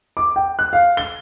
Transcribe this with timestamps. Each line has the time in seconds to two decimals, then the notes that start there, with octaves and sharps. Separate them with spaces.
0.17 D6
0.36 G5
0.59 F#6
0.73 F5
0.97 G7